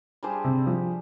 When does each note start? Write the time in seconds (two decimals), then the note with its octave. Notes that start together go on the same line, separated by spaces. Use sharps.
0.23 G3 D4 G#4 C5
0.44 C3
0.66 F3